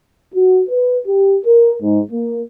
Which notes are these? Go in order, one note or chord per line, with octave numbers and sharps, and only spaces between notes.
F#4
B4
G4
A#4
G#2
A#3